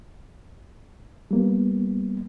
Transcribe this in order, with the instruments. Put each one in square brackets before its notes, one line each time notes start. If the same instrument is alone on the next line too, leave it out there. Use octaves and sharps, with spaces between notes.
[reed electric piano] G3 A#3 B3